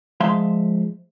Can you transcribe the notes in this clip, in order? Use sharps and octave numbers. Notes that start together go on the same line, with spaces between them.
F3 G#3 E5 F5 C6